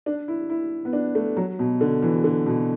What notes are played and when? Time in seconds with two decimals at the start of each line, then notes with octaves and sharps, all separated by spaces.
0.06 D4
0.28 E4
0.50 E4
0.85 B3
0.93 D4
1.15 A3
1.37 F#3
1.59 B2
1.81 D3
2.02 E3
2.24 D3
2.46 B2